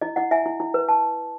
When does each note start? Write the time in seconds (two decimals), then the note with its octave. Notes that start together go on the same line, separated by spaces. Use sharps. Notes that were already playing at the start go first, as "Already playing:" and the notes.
0.01 E4 D#5
0.16 E4 D#5 F#5
0.31 E4 E5 G#5
0.46 E4
0.60 E4
0.74 B4
0.89 A5